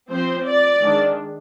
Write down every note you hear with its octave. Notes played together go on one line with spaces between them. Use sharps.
F3 C4 C5
D5
D#3 G#3 D4